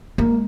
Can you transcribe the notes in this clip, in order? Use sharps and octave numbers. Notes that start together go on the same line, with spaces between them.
G#3 A#3